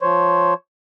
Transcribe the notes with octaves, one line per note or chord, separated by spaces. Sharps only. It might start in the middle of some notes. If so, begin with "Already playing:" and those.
F3 C5 C#5